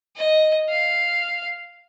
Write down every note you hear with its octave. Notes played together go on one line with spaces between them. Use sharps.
D#5
F5